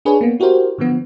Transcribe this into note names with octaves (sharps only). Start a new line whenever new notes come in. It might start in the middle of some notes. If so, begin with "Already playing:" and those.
D4 G#4 B4 C#5
A#3 B3
E4 F#4 G4 A#4 C5
D3 E3 F3 B3